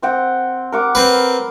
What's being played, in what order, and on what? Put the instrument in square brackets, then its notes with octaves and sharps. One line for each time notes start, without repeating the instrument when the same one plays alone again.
[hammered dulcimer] C4 F#5 G5
A#4 F#5 D6
[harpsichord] C4 B4